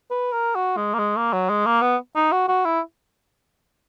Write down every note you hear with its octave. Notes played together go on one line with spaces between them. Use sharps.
B4
A#4
F#4
G#3
A#3
G#3
A#3
F#3
G#3
A#3
B3
D#4
F#4
F#4
E4